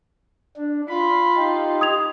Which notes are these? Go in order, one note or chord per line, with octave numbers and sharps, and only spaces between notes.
D4
F4 B5
D#4 G4
D#6 G#6 F7